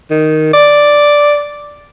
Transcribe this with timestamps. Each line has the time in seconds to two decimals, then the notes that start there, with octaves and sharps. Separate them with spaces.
0.11 D#3
0.54 D5